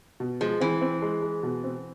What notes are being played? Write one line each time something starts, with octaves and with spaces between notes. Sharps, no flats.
B2
F3 G#3
E3 C4
C4
G#3
G#3
B2
C4